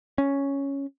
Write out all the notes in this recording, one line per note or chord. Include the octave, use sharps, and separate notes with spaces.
C#4